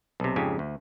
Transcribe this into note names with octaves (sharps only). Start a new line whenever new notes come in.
B1 C3
F2 G#2 C#3 G4 G#5
D2